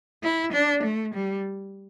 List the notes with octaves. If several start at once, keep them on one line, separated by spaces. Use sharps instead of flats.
E4
D4
A3
G3